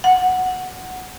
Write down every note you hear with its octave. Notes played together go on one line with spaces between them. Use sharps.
F#5